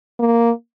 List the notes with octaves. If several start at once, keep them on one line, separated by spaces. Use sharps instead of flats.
A#3